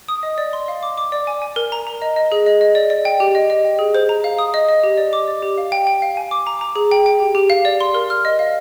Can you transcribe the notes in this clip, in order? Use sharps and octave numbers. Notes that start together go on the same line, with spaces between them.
D#6
D#5
D5
C6
F5
D6
D6
D5
G#5
G#5
A#4
A#5
A#5
D#5
D#5
G#4
D#5
D#5
D5
D5
G5
G4
D#5
D#5
G5
G#4
C5
A#5
F5
D#6
D#5
D#5
G4
D5
D6
D5
G4
F5
G5
G5
F5
G#5
D6
A#5
A#5
G#4
G5
G5
G4
G4
F5
D5
C6
A#4
F6
D#5
F5